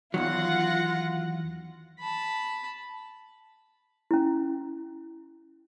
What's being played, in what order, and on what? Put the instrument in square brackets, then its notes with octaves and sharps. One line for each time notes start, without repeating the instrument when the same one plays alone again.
[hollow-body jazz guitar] E2 D#3 F#3 [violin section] F4 F#5 A#6
[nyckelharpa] A5 B5
[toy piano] C#4 E4